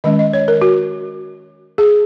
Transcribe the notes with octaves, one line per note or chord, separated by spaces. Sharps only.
D#3 G#3 C#4 D#5
D#5
C#5
A#4
F#4
G#4